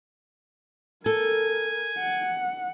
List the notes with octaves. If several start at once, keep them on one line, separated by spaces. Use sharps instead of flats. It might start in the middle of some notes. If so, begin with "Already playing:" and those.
A4 A#4 G#5
F#5